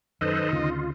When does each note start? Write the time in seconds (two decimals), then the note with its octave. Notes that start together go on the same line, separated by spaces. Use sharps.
0.21 F#2 D#3 D#4 A4 B4 C5 D#5
0.52 D2 C#3 F4